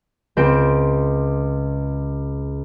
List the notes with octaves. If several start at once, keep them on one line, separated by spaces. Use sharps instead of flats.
C#2 C4 C6 D7